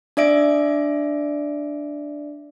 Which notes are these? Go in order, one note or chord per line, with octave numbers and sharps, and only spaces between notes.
D4 D5 E5 D7